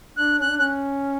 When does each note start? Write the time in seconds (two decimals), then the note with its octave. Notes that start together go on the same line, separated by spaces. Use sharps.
0.17 D4 F#6
0.41 C#4 F#6
0.50 D4
0.59 C#4 F#6